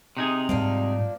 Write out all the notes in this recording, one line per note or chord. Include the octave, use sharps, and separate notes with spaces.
C3 D#4 G#4
G#2 F3 G3 A#3 D4